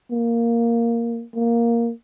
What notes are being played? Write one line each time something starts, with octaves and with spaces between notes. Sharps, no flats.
A#3
A#3